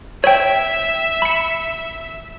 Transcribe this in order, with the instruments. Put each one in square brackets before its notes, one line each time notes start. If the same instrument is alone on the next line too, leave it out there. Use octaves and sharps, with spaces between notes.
[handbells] C#5 G5 [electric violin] E5
[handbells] B5 C#7